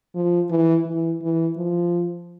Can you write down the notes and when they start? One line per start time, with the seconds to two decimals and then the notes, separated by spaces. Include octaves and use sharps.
0.15 F3
0.50 E3
0.86 E3
1.22 E3
1.57 F3